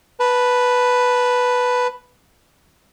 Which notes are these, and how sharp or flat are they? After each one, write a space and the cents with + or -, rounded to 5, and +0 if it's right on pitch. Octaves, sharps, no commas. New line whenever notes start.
B4 +0 A5 +0